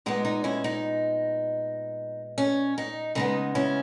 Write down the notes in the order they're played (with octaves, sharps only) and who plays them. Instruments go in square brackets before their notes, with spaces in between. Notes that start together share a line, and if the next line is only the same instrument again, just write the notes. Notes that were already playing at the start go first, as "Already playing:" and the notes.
[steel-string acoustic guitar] A#2 G#3 B3 D#4
D#4
C#4 E4
D#4
C#4
D#4
C#3 G#3 B3 D#4
C#4 E4